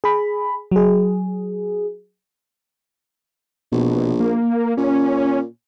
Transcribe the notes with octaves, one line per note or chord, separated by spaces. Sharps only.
G#4 B5
F#3 G#4
A#1 B2
A#3
A#2 C#4